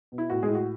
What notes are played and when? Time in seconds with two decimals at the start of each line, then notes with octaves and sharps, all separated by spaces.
0.12 B2
0.18 E4
0.30 A2 F#4
0.43 G#3 G#4
0.49 A2
0.55 F#4